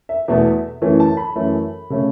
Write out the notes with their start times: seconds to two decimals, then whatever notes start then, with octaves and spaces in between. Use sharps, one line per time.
0.09 E5
0.28 E2 B2 A3 E5
0.81 F#2 E3 A3 C#4
1.00 A5
1.17 B5
1.35 F#2 E3 A3 C#4
1.90 C#3 A3 C#4